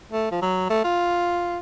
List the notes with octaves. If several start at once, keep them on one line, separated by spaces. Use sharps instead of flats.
A3
F3
F#3
A3
F4